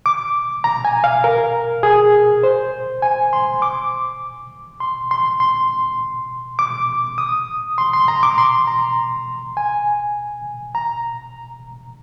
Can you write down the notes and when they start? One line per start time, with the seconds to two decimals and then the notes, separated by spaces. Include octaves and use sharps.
0.06 D6
0.64 A#5
0.85 G#5
1.04 F5
1.24 A#4
1.83 G#4
2.43 C5
3.02 G#5
3.33 C6
3.62 D6
4.80 C6
5.11 C6
5.40 C6
6.59 D6
7.18 D#6
7.78 C6
7.93 C6
8.08 A#5
8.23 D6
8.38 C6
8.67 A#5
9.57 G#5
10.75 A#5